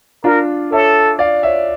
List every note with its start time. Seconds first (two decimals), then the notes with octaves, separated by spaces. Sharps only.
0.24 D4 F4 A#4
0.72 A4 C#5 E5
1.19 D5 F5
1.43 C#5 E5